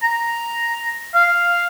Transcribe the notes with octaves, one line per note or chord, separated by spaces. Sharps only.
A#5
F5